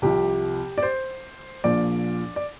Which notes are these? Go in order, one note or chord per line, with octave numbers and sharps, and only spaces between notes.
C2 C3 F3 G4
D5
C5
A#1 A#2 F3 D5
D5